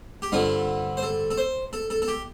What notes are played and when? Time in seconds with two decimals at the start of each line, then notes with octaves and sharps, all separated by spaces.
0.22 G4
0.32 G2 D3 G3 C4 F4
0.97 C5
1.03 A4
1.31 A4
1.38 C5
1.73 A4
1.90 A4
2.02 A4
2.08 G4